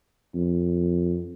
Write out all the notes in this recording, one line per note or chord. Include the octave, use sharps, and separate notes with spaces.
F2